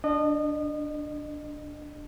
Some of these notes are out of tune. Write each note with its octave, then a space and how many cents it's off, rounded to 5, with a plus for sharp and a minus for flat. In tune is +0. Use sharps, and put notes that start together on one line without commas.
D4 +0 D#5 -30